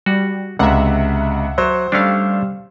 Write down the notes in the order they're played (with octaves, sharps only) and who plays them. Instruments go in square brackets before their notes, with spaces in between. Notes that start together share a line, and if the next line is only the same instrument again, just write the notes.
[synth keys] G3 [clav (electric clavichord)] F#4
[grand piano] C#2 A#5 [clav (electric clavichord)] C3 [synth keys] E5 F#5
[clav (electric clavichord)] F#3 [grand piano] C5
[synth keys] G3 F5 [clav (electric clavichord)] A3 C#4 D4